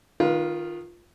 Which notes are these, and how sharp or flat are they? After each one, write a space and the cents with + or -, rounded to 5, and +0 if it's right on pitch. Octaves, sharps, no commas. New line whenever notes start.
D#3 -10 F4 +0 B4 -40